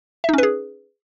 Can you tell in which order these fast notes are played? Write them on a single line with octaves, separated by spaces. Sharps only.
E5 D#4 C#4 B4 G#4